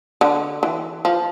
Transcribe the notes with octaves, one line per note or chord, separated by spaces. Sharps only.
D3
E3
F3